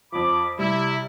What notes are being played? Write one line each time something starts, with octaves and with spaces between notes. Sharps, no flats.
F2 F3 B5 D6
C3 G3 E4